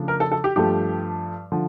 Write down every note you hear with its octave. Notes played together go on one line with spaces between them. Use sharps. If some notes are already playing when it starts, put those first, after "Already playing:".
Already playing: C#3 F3 A3 D4
A#4
A4
A4
G4
G2 F3 A3 G4
D3 F3